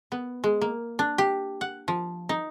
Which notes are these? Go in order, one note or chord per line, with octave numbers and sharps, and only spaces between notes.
B3
G#3
A#3
D4
G4
F#5
F3
D#4